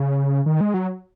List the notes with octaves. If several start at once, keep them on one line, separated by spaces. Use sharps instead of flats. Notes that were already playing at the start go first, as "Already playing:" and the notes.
Already playing: C#3
D#3
G#3
F#3